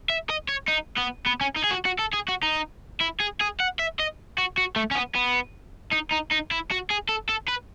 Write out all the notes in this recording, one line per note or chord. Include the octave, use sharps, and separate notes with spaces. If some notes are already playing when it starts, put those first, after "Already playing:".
E5
D#5
C#5
D#4
B3
B3
C#4
D#4
G#4
F#4
F#4
A4
G#4
F#4
D#4
E4
G#4
G#4
F#5
E5
D#5
F#4
F#4
A3
C#4
B3
B3
D#4
D#4
D#4
E4
F#4
G#4
A4
A4
B4